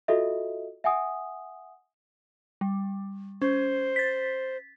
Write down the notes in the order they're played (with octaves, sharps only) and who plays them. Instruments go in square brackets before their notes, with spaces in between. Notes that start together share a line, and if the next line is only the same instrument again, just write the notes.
[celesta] F4 F#4 A4 D#5 E5
E5 F#5 G#5 D#6
[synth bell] G3
[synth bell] C#4 [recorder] C5
[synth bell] A6 B6